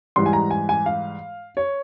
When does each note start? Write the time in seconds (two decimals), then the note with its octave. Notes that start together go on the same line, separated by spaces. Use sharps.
0.16 G#2 E3 G3 C6
0.26 G#5
0.33 A#5
0.51 G#5
0.69 G#5
0.86 F5
1.57 C#5